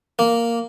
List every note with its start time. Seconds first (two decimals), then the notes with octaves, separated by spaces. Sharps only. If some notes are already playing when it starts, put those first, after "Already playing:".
0.19 A#3